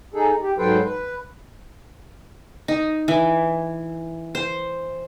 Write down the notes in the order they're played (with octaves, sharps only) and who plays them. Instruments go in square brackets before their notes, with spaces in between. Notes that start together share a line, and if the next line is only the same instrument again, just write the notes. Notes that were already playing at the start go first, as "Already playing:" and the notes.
[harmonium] D#4 G#4 A4
G4
G#2 F#3 A4 B4 C5 G5
B4
[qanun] D#4
E3
C5